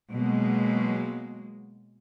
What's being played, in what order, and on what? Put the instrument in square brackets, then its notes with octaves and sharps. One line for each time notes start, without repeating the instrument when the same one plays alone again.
[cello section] B2 F#3 G#3 A#3